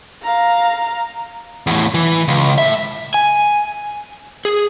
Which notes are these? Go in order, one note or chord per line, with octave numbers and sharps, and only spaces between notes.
F5 A#5
E2 A2
E3
C#2
A2 E5
G#5
G#4